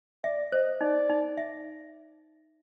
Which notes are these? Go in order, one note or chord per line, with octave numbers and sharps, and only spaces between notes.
D5 E5
C5 D#5
D#4 D5
D#4
E5